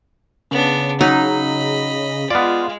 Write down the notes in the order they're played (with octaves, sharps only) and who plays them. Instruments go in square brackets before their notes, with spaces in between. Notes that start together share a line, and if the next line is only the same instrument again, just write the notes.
[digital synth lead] C#3 [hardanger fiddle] B3 D4
[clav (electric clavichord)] F#3 [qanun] D#4 [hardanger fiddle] D#5 B5
[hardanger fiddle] G#3 [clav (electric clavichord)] B3 D5 [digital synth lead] F4